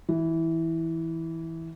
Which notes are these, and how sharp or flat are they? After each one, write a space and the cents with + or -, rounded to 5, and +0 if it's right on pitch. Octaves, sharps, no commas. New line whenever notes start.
E3 -10